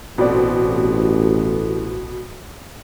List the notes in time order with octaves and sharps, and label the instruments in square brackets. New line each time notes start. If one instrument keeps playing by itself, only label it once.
[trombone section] A1 [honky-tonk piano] B2 C4 D5